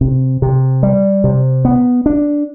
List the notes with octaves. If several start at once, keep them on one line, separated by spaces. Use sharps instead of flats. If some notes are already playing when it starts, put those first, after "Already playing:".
C3
C3
G3
C3
B3
D4